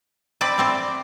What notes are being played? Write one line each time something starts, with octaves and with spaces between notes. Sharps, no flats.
C4 D5 B5 D6
A3 C4 C5